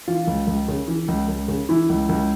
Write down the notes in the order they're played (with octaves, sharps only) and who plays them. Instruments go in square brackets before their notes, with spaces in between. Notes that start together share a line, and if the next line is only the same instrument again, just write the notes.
[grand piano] E3 F4
C#2
C#2
C#3
E3
C#2
C#2
C#3
E3 E4
C#2
C#2